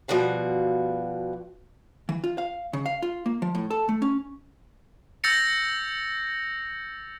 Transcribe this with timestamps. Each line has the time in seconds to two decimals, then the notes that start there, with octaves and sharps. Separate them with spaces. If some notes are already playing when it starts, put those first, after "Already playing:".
0.08 B2 F3 G3 F#4 F5
2.09 E3
2.24 F4
2.38 F5
2.73 C#3
2.86 F5
3.02 F4
3.26 A#3
3.42 F3
3.55 A2
3.70 A4
3.89 A3
4.02 C#4
5.24 E6 G6 A6 A#6 C#7 F7